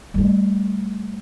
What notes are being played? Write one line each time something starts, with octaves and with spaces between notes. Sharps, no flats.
G3 A3